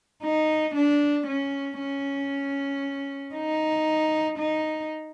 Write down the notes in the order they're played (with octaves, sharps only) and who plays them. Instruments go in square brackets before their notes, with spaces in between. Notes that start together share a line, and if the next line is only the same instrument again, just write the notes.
[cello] D#4
D4
C#4
C#4
D#4
D#4